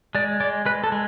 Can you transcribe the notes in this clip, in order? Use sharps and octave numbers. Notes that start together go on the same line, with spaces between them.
G#3 D5
G#3 D5
G#3 B4
A4
G#3